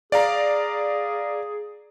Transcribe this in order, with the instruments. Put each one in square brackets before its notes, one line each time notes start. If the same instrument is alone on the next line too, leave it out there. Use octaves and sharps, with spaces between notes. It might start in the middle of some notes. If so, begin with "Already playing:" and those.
[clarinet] G#4 [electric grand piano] D5 F5 A#5